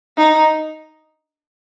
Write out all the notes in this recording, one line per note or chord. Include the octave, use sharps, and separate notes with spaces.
D#4